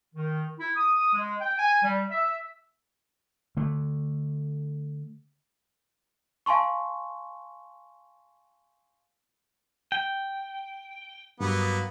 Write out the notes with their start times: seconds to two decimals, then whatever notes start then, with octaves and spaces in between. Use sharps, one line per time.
0.15 D#3
0.59 E4
0.76 D#6
1.14 G#3
1.41 G5
1.59 G#5
1.83 G3
2.10 E5
3.57 D3 A3
6.46 F5 G#5 A5 C6 C#6
9.92 G5
11.41 G2 F#3 A#3 B3